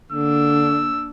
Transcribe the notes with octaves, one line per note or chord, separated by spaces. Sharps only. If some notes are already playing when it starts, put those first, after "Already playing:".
D3 A#3 D4 E6